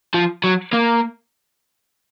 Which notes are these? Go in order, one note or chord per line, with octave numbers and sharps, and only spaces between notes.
F3
F#3
A#3